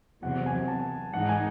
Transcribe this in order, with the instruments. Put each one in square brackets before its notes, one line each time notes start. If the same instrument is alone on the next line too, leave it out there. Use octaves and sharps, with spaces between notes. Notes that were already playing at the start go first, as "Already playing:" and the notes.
[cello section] E2 C3 F#3 [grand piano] F#5
[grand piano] G#5
A5
[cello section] G#2 E3 G#3 D#4 [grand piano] F#5
[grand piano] G#5